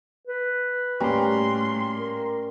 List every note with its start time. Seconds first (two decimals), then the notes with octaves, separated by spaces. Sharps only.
0.27 B4
1.00 A2 G3 A#3 C#4 C6
1.95 A#4